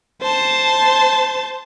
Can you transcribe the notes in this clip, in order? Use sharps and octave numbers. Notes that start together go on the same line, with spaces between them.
C5 A5